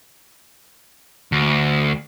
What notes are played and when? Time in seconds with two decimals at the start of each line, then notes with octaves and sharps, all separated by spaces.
1.32 D2